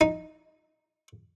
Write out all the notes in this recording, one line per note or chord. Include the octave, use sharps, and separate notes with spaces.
D#4